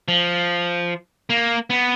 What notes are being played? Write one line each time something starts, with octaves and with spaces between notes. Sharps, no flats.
F3
A#3
B3